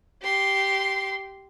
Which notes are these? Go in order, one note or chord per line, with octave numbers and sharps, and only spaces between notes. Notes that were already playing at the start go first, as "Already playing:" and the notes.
G4 C6